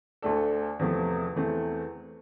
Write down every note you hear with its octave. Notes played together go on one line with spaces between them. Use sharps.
D2 D3 A3 D4 A4
E2 C3 F3 A3
E2 E3 A3 C4